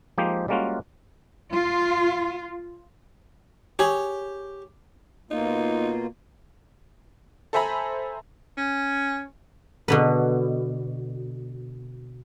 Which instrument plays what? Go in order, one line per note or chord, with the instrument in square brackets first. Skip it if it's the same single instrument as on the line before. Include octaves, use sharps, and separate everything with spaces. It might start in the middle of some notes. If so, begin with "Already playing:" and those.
[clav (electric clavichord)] F3 G#3 A#3 D#4 G4 C5
G3 G#3 A#3 C#4 F4 F#4
[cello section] F4
[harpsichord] G4 [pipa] G#4 C#5
[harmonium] B2 A#3 F4 [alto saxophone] D#4
[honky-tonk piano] A4 C5 E5 G#5 A#5 B5
[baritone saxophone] C#4
[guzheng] B2 D3 B4